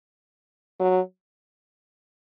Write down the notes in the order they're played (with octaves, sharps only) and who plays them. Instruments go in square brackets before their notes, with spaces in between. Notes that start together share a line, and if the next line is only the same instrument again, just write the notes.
[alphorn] F#3